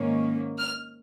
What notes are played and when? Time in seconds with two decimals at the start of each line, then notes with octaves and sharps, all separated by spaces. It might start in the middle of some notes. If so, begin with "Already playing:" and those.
Already playing: G#2 D#3 A#3 C#4
0.58 F6